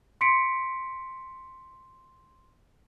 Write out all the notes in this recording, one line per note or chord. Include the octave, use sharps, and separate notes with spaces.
C6 B6 C#7 D7